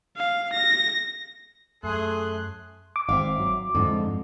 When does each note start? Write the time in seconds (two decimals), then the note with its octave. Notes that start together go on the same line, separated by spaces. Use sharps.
0.17 F5
0.54 A#6
1.84 F#2 A3 G#4 C6 F#6
2.96 D6
3.09 G#1 C4 E5 F5
3.40 F#3
3.75 F2 G#2 D3 F4 D#5